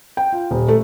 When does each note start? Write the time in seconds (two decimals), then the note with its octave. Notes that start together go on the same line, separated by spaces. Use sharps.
0.17 G5
0.32 F4
0.51 D#1
0.68 A3